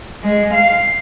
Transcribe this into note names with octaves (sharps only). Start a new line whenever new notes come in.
G#3
F5